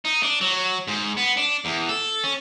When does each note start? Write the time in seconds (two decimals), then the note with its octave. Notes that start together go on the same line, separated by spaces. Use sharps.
0.05 D#4
0.23 D4
0.41 F#3
0.88 G#2
1.17 B3
1.37 D4
1.65 E2
1.89 A4
2.24 C#4